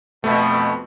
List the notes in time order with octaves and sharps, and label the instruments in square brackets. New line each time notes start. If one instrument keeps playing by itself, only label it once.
[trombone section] F2 B2 [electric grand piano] A3